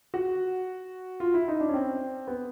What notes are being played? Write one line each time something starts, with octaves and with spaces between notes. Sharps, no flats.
F#4
F4
E4
D#4
D4
C#4
C4
B3